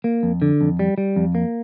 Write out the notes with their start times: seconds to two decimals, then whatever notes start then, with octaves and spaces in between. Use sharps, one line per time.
0.04 A#3
0.23 F2
0.42 D3
0.61 F2
0.79 G3
0.98 G3
1.16 F2
1.35 A#3